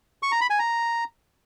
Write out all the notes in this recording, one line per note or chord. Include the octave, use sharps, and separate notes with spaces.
C#6
A#5
B5
G#5
A#5